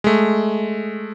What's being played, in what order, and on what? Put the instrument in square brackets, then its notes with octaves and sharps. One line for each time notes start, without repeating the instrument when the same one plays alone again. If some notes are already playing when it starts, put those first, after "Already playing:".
[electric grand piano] G#3 A3